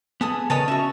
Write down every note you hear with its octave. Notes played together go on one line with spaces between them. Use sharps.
B3 G#4 A4 D#6
C#3 A#4 B4 C#5 D#5 A5
C#4 F#4 E5 C#6